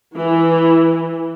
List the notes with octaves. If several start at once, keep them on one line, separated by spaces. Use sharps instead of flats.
E3